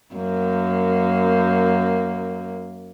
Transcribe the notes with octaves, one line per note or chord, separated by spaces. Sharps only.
F#2 A#3